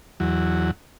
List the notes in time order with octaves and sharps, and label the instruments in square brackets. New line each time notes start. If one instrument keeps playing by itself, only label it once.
[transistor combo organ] E2 F#3